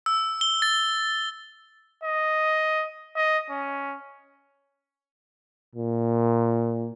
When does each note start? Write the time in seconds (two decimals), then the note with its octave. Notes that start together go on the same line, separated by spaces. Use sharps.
0.06 E6
0.41 G7
0.62 A6
2.04 D#5
3.16 D#5
3.50 C#4
5.76 A#2